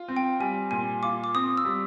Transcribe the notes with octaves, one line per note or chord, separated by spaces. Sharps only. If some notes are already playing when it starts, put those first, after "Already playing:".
Already playing: F4
C4
G5
G3 G#5
A#2 G#5
F4 D6
D6
C4 D#6
E6
G3